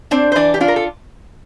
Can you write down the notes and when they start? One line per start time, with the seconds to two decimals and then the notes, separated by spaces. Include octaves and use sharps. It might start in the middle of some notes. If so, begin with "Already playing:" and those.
0.11 C4 D4 C5
0.32 C5
0.35 E3 D4 D5
0.54 G4
0.60 D4 F4
0.68 A#4
0.76 A4